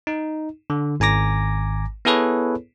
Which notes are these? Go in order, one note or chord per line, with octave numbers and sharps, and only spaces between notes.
D#4
D3
G#1 G#5 A#5 D6 A#6
B3 E4 G#4 A4 B4 C#5